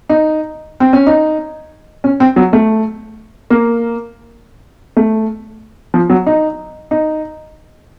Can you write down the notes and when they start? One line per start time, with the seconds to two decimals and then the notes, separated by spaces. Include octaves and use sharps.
0.09 D#4
0.80 C4
0.93 C#4
1.07 D#4
2.04 C#4
2.20 C4
2.36 F#3
2.53 A3
3.50 A#3
4.97 A3
5.94 F3
6.10 F#3
6.27 D#4
6.91 D#4